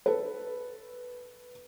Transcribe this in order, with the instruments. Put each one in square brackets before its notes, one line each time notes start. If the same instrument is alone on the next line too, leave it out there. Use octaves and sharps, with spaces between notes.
[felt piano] A4 B4